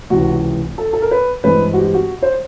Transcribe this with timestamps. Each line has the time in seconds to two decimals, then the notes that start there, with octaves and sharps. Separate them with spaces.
0.10 C#2 C3 E3 F#4
0.78 A4
0.93 A4
1.02 A#4
1.11 B4
1.44 G2 E3 G#3 C4 B4
1.73 F#4
1.77 G4
1.94 F#4
2.22 C5